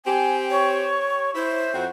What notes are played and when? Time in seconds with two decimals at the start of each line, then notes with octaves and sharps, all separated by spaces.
0.06 C4 G4 G#5
0.50 C#5
1.35 E4 C5
1.74 F2 C4 F#4